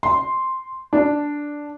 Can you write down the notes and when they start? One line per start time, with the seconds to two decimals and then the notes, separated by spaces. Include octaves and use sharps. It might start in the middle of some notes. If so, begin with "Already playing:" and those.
0.03 C6
0.93 D4